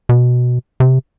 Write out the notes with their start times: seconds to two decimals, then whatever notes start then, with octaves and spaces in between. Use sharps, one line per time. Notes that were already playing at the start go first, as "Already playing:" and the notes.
0.09 B2
0.80 C3